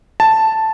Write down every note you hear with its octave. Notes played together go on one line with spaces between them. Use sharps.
A5